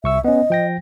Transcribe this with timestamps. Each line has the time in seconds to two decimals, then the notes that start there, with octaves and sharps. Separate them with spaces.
0.04 C2 E5 C#6 E6
0.24 B3 C#4 D#5
0.50 F3 G5 A#6